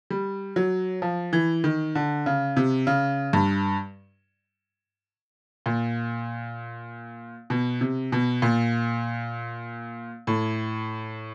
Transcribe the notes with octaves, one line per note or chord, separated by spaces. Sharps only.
G3
F#3
F3
E3
D#3
D3
C#3
C3
C#3
G2
A#2
B2
C3
B2
A#2
A2